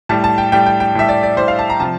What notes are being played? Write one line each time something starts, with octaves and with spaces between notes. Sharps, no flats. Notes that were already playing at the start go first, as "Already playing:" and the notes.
A2 G3 A5
A5
G5
A2 G3 G5
G5
G5
A2 G3 E5
D5
D5
A2 G3 C5
F5
A5
A#5
C3 F3 A5